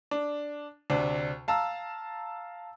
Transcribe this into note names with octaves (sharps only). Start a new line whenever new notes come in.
D4
D2 C3 D4
F5 A5 A#5 E6